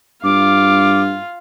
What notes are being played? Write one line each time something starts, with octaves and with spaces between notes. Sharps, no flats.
G2 F4 F5 D6